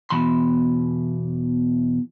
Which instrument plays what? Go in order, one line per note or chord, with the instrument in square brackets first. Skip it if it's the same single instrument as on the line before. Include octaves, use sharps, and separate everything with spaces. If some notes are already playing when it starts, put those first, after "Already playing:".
[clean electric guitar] E2 G#2 B2 E3 B5 C6